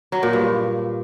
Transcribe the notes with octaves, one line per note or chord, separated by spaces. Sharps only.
F#3
A#2
G2